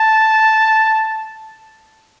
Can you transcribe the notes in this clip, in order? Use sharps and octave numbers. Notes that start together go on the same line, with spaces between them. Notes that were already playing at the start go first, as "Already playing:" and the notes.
Already playing: A5